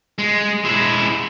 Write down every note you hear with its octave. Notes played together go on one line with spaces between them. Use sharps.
G#3
G#3 E4